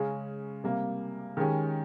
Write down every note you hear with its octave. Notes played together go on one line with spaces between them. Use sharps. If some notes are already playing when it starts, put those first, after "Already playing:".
Already playing: C#3 G#3 C#4
C3 G3 A#3
D#3 G#3 C#4 G4